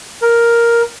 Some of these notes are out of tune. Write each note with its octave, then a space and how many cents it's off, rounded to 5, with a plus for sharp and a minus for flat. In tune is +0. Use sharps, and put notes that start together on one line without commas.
A#4 +5